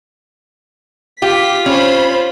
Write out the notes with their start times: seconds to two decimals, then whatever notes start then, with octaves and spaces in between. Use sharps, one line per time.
1.22 F4 G4 B6
1.66 C#4 C5 C#5 B5